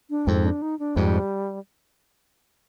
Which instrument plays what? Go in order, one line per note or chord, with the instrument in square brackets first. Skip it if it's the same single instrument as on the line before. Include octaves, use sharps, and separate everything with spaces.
[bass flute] D4
[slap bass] F2 G#2 [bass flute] C4
[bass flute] D4
D#4
D4
[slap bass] F2 G#2 [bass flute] G3